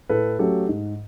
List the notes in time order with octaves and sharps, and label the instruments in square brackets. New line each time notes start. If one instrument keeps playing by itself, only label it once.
[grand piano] A2 A4 B4
F#3 A3 C#4 G4 A4
G#2